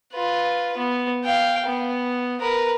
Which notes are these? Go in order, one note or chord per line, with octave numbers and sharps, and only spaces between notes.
F4 B4
B3
F5 G5
B3
A#4 B4